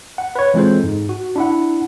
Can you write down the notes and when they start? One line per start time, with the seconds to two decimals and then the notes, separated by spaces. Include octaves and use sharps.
0.18 F#5
0.35 B4 C#5
0.54 E3 G#3 C4 F4 A4 C5
0.84 G#2
1.09 F#4
1.36 D4 E4 F#5